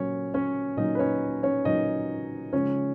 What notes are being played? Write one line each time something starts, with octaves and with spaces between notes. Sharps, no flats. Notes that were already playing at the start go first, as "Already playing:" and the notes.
Already playing: A#2 F#3 C#4 C#5
C#4 C#5
A#2 F#3 D#4 D#5
B4
C#4 C#5
C#4 C#5
A#2 F#3 D#4 D#5
C#3 F3 G#3 C#4 C#5